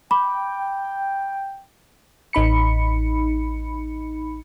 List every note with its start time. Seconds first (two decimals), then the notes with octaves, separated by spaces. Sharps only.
0.11 G5 B5 D6
2.33 A1 D#4 B5 C#7